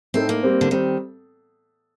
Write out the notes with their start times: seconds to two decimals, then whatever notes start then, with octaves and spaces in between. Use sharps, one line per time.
0.14 A2 A3 C4 D#4 A4
0.29 A#3
0.42 G3 C4 G4 C5
0.61 D3
0.71 D#3 G3 C4 G4 C5